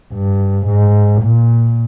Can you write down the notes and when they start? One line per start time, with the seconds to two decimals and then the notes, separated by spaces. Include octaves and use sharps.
0.13 G2
0.67 G#2
1.22 A#2